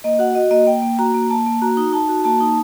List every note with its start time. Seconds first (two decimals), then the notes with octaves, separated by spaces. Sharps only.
0.04 A#3 D#5
0.19 F#4 F#5
0.35 F#4 D#5
0.51 A#3 D#5
0.67 A#3 G5
0.82 A#3
0.99 F#4 A#5
1.14 A#3
1.30 A#3 A5
1.46 A#3
1.62 F#4 A#5
1.77 D#4
1.93 D#4 A5
2.09 F#4
2.24 A#3 A5
2.41 D#4